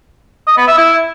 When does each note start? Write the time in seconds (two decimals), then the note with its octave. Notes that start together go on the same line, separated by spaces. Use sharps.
0.47 D#5
0.57 B3
0.67 E5
0.78 E4